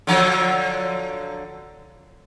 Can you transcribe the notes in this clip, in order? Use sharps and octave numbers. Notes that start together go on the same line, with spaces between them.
D3 F3 F#3